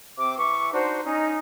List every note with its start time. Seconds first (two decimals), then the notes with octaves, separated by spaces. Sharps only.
0.18 C3 C4 D6
0.38 E3 E5 C#6 D6
0.73 D4 D#4 F#4 C5
1.05 C#4 D#4